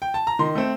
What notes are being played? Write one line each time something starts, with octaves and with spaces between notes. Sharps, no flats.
G5
A5
A#5
D#3 C6
A3 C4